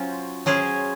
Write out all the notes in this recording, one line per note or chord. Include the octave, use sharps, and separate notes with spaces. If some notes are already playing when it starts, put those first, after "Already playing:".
Already playing: F#3 C#4 F4 C5
F#3 C#4 G#4 C5